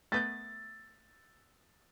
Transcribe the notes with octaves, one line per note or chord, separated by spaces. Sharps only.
A3 B3 G6 A6